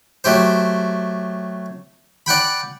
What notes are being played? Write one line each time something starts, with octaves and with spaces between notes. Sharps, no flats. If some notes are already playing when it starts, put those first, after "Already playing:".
F#3 A3 G4 C5
D5 F#5 G5 B5